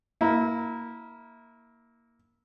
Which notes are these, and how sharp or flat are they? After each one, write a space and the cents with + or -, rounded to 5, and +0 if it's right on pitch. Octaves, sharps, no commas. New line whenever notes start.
A#3 +0 E4 -20